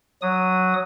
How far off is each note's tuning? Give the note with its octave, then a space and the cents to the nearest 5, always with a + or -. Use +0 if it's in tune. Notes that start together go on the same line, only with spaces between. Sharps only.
F#3 +0 D#6 +0